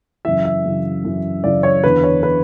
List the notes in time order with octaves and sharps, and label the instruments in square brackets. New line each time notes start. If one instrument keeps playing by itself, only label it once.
[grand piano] F#2 C#3 E3 E5
E5
F#2 C#3 E3
F#2 C#3 E3
F#2 C#3 E3 D5
C#5
E2 D3 B4
C#5
D3 B4